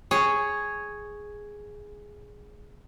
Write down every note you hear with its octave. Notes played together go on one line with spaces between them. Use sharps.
G#4 C#5